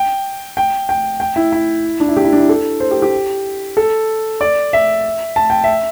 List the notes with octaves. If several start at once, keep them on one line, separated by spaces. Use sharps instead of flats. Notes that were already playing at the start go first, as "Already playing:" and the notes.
Already playing: G5
G5
G5
G5
E4
E4
D4
E4
G4
E4
D4
E4
A4
C5
G4
G4
A4
D5
E5
A5
G5
E5